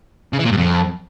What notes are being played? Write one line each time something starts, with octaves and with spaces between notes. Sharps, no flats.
C#3
E3
A#2
G2
F2